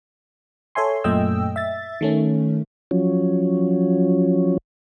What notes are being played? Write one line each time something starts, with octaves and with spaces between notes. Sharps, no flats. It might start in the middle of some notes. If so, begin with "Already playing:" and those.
A4 C#5 E5 G#5 C6
F#2 A#2 A3 D#5 G5 E6
E5 A6
D#3 A3 C#4
F3 F#3 C#4